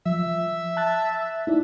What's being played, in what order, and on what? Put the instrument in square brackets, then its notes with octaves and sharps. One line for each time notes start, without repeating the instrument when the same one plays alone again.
[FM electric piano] F3 [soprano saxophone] E5
[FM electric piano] A5 F#6 A6
D#4 E4 D5